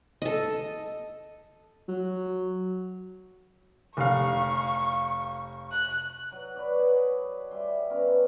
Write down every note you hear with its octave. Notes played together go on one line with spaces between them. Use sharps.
A4 D#5
F#3
F1 F5 C#6
F#6
F#3
B4 C#5 D5
G#4
G3 E5 B5 C6
B2 G3 C#4 A#4